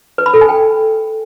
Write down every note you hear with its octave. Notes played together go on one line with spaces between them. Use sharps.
B4
B5
A4
G#5
G5